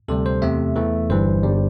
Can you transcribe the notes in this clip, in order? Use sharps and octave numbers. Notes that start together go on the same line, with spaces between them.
D2 C3 G3 A4
C5
E2 C3 A3 E5
E2 E3 A3
G1 G2 E3 G3 C5
G1 G2 G3